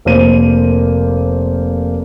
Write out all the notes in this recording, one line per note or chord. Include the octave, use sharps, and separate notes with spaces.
F1 A#3 C5 D#7